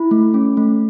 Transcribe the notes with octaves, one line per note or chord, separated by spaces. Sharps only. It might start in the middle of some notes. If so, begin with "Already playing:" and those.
Already playing: E4 B5
A3
C#4
A3